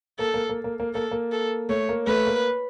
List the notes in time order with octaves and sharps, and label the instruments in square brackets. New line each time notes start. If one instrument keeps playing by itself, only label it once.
[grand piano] A#3 [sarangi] A4
[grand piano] A#3
A#3
A#3
A#3
[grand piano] A#3 [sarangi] A4
[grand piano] A#3
[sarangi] A4
[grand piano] A3 [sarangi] C#5
[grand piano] A#3
[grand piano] A3 [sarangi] B4
[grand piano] A#3